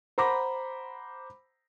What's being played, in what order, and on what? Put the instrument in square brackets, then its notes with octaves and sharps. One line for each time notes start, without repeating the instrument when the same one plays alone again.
[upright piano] C5 F#5 A#5 B5 D6 A#6